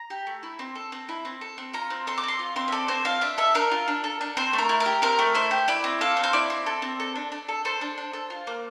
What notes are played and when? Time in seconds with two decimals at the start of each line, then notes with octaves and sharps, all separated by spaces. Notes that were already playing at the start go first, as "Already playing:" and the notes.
Already playing: A#5
0.10 G4
0.27 A3
0.43 E4
0.59 C4
0.75 A4
0.92 C4
1.09 E4
1.25 C4
1.41 A4
1.58 C4
1.74 F4 A#5
1.90 C4
2.07 A4 C6
2.18 D6
2.23 C4 C6
2.39 F4
2.56 C4 C6
2.68 E5
2.72 A4 D5
2.88 C4 C5
3.05 F4 F5
3.21 D4 E5
3.38 A4 E5
3.55 D4 A#4
3.71 F4
3.88 D4
4.04 A4
4.21 D4
4.37 C4 C5
4.53 A3
4.58 A#4
4.69 E4
4.80 A#4
4.86 G4
5.02 C4 A#4
5.19 A3
5.34 E4 C5
5.51 G4
5.68 E4 D5
5.84 C4
6.01 A4 F5
6.17 C4
6.23 C5
6.33 E4 D5
6.50 C4
6.66 A4
6.82 C4
7.00 A4
7.16 D4
7.32 D4
7.48 A4
7.65 A4 C5
7.81 D4
7.98 D4
8.13 A4
8.30 F4
8.47 A#3